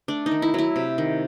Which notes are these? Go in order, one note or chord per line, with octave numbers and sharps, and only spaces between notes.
A3 D4
D#4
D#3
E4
F#3 E4
C3
D#3